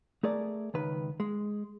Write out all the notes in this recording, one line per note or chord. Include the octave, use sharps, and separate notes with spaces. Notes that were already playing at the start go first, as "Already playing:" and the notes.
A3 G#4 A#4 D5
C#2 D#3 B4
G#3